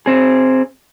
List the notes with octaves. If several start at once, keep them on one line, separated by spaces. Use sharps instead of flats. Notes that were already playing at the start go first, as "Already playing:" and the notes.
C4 G#4